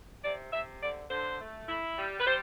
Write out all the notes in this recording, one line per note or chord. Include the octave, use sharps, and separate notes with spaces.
C3 D5
C3 E5
D3 D5
D3 C5
A3
E4
G3
B4
G3 C5